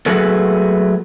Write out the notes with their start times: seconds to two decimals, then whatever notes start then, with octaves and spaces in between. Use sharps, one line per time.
0.06 F#3 A3 F#4 G#4 A4 B4